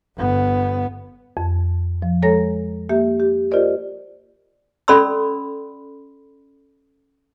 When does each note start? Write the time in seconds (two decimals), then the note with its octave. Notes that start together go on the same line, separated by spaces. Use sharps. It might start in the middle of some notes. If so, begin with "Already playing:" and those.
0.17 G1 B3
1.37 F2
2.02 F3
2.22 G#3 A4 C#5 A#5 A#6
2.89 A#3 G4 E5
3.20 G4
3.51 F4 G4 A#4 C5 D5 D#5
4.88 C#4 A4 D5 B5 C6 E6